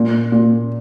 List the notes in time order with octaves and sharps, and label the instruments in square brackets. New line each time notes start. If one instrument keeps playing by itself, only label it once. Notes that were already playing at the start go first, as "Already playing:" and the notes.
Already playing: [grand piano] A#2
A#2